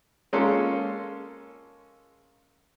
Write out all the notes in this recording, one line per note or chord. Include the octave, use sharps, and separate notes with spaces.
G#3 A#3 C#4 F4 A4